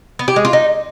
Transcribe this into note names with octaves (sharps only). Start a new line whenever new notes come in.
B3
G4
G#3
F4
D#4